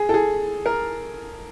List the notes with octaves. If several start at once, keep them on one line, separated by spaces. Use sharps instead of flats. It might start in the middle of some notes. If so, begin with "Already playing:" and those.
Already playing: G#4
A4
G#4
A#4